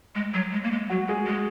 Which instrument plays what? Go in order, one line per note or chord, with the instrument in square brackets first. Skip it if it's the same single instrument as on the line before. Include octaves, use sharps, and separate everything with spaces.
[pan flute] G#3
F#3
G#3
A#3
G#3
[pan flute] F#3 [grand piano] F#4
[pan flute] G#3 [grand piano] G#4
[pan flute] G#3